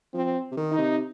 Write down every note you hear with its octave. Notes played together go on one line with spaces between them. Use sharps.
F3 C4
C3
D#3
D#4
C3